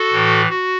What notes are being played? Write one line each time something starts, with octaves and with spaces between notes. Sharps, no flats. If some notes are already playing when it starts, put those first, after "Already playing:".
Already playing: F#4 A4
A2 E3
F#4